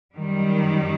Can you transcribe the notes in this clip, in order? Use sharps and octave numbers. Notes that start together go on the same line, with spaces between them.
F#2 D#3 G3